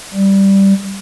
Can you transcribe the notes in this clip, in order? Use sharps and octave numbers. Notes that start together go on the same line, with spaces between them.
G3